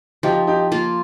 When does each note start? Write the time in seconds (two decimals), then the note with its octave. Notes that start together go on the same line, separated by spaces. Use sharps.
0.23 F3 D#4 G4
0.47 D#4 G4
0.72 A#3 F4